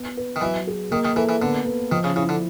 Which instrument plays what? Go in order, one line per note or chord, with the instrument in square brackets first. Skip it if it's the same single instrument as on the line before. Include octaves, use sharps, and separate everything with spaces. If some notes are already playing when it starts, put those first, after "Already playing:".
Already playing: [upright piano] B3
B4
[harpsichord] D#3
[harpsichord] E3 [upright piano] F#3
[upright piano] G#4
[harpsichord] D#3 [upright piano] A#3
[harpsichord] D#3
[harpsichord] E3 [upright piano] A4
[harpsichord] E3
[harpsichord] D3 [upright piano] B3
[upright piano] B3
[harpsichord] D#3 [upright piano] F3
[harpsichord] C#3
[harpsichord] C#3 [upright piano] E4
[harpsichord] D3